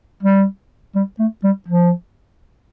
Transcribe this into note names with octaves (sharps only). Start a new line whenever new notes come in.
G3
G3
A3
G3
F3